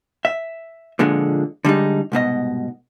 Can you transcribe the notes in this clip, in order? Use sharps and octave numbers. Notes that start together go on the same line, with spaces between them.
E5
A#2 D3 F3 G#3
D3 G3 G#3 D#4
C2 G#2 B2 D#5